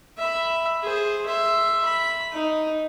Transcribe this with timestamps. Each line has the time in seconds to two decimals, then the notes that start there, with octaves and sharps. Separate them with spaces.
0.18 E5 B5
0.83 G#4 C5
1.26 E5 C6
1.85 B5
2.32 D#4